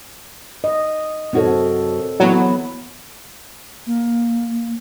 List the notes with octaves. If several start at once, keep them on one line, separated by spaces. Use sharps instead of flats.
D#5
F#2 C4 F#4 A4 C#5
E3 F#3 B3
A#3